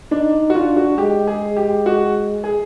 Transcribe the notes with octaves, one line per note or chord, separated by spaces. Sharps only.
D4 D#4
F#4
D4 F4
F#4
G#3 G4
G#4
G4
F#4
G#4